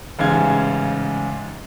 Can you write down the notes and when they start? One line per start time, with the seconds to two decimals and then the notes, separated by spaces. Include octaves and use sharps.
0.19 A1 G#2 C#3 F5 G#6